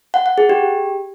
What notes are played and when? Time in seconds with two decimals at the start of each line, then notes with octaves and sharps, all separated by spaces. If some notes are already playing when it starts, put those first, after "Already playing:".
0.14 F#5
0.26 F#5
0.38 G#4
0.49 G4